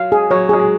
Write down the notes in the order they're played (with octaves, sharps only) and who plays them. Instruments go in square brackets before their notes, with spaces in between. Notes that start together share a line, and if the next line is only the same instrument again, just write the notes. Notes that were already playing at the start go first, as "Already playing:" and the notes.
Already playing: [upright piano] F#3 [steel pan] F5
[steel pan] G#4
[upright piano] F#3 [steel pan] C#5
[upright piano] F#3 [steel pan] G#4
[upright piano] G#3